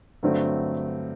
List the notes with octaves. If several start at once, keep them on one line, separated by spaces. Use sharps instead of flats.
G2 D3 F#3 A3 C4